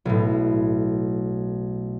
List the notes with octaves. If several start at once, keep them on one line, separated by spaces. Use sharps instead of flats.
B1 A2